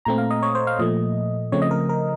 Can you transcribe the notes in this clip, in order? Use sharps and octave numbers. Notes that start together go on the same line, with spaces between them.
A#2 A3 C4 A#5
F5
D#5
C#5
C5
F5
A#2 F3 A3 D#5
C#3 F3 A3 C4 C#5
D#5
A#4
A#4